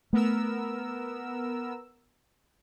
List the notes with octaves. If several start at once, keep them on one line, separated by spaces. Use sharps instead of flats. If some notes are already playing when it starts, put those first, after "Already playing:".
A3 B3 A#4 E6